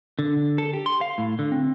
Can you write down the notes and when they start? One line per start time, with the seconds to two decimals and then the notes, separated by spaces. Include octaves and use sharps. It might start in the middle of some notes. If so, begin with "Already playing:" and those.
0.19 D3
0.58 A4
0.73 G4
0.86 C6
1.01 F5
1.18 A2
1.39 D3
1.52 C4